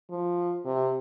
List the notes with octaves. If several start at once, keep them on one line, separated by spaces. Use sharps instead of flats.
F3
C3